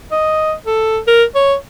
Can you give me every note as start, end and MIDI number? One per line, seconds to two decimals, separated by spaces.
0.11 0.53 75
0.66 0.99 69
1.07 1.24 70
1.35 1.55 73